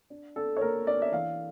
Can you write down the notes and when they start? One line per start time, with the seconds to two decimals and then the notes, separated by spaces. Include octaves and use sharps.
0.10 D4
0.36 D4 A4
0.57 C#5
0.61 A#3 A#4
0.87 D4 D5
1.02 E5
1.12 E3 F5